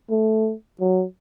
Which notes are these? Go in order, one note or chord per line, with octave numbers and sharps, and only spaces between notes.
A3
F#3